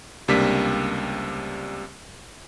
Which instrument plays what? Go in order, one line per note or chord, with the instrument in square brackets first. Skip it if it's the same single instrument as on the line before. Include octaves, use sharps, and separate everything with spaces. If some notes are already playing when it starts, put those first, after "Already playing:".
[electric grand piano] C#2 C3 G3 A#3 D4 B6